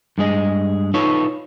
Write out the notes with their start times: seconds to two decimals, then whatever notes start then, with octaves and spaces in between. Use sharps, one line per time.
0.18 G2 G#3 G#4 D#5
0.94 D#4 F4 A4 B4 C#5